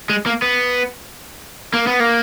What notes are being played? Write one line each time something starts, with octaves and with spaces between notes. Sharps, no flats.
G#3
A#3
B3
A#3
B3
A#3